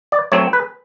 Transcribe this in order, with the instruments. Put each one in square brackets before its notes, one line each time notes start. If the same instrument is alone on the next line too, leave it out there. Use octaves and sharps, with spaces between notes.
[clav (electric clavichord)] D5
F#3 A3 C4 C#5
B4